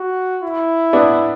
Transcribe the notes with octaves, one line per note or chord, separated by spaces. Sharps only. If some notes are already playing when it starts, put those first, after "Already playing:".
Already playing: F#4
E4
B3 D4